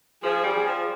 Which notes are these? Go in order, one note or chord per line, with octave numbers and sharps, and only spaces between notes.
F3 G#4
G3
F3